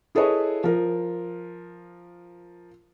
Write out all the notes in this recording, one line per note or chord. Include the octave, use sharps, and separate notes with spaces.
E4 G#4 A4 B4 C#5 D#5
F3 A#4